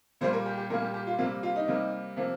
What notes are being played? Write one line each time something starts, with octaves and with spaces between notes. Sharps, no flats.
A#2 G3 A#3 C5
A#4
G4
G4
A#2 G3 A#3 A#4
G4
G4
F4
C3 G3 A#3 F4
F4
D#4
C3 G3 A#3
C3 F3 A#3